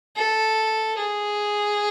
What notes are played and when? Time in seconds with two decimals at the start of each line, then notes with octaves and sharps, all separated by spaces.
0.16 A4
0.98 G#4